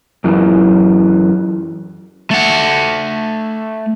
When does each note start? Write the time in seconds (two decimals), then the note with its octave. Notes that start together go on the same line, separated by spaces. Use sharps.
0.24 F#2 E3
2.31 A3 F#5